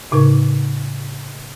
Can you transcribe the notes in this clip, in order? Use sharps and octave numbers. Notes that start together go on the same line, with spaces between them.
A2 C#3 D#4 A#4 C#6